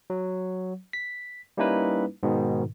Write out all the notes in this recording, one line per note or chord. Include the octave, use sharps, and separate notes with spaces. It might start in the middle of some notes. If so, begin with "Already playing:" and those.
F#3
B6
G3 A#3 C#4 D#4 E4 B4
G#2 B2 D#3